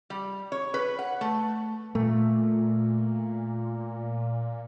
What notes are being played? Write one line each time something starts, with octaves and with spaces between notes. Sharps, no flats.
G3
C#5
B4
F#5
A3
A#2 A3